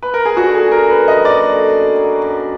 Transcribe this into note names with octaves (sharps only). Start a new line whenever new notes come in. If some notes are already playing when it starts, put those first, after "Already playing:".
B4
A#4
G#4
D3 F#4
G#4
F#2
A#4
F#3 B4
D#5
F#2
D5
D3
F#2
F#3
F#2